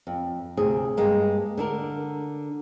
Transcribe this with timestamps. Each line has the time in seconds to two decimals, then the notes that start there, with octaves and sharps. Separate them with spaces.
0.07 F2
0.57 D2 C3 G#4
0.97 G2 G#3 A#3
1.57 D3 D4 A#4